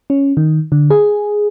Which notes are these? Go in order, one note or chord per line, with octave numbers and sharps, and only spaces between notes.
C#4
D#3
D3
G#4